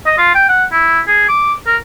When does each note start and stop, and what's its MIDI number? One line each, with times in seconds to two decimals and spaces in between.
0.06 0.16 75
0.18 0.32 65
0.35 0.49 79
0.49 0.65 78
0.72 1.00 64
1.07 1.28 68
1.29 1.53 86
1.67 1.77 70